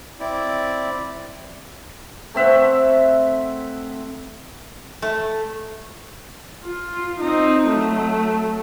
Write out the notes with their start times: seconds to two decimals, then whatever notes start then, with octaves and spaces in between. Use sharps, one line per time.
0.20 C4 E4 D5
2.34 A3 C4 E5 F#5
5.02 A3
6.65 F4
7.20 C4 D#4
7.67 F#3 A3